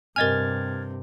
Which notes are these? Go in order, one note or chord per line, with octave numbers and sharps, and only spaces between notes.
G2 C3 A#4 D#5 G#5 F6 G#6 A6